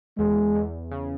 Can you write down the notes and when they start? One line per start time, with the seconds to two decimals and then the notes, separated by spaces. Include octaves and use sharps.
0.18 E2 G#3
0.55 E2
0.91 C#3